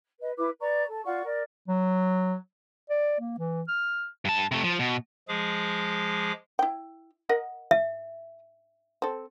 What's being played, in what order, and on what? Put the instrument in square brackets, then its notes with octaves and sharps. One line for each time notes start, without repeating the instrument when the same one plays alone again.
[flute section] B4 D#5
E4 B4 D6
B4 D5 A#5 C#6
A4
F4 D5 F#5 C#6
A#4 D5
[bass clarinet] F#3
[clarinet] D5
A#3
E3
F6
[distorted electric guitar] G2 A5
C3 A3
F3
B2
[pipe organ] F3 G#3 G#4 D6
[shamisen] E4 G5
A#4 D#5 F#5
[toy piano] E5
[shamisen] C4 A4